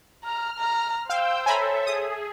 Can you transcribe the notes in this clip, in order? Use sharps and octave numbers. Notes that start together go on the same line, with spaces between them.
A#5 F6
A#5
C5 F5 G5 E6 G6
A4 C#5 E5 G#5 A#5 B5
G#4 D#6